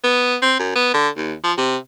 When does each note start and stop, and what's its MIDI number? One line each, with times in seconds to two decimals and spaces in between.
0.04 0.36 59
0.42 0.55 60
0.59 0.74 42
0.76 0.89 59
0.94 1.09 50
1.17 1.34 39
1.44 1.53 53
1.58 1.77 48